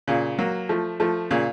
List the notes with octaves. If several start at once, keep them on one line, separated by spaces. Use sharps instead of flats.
A#2 C#3
F#3 A#3
F3 A3
F3 A3
A#2 C#3